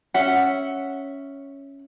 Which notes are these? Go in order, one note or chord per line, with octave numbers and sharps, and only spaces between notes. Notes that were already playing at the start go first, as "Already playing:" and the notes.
C#4 E5 F#5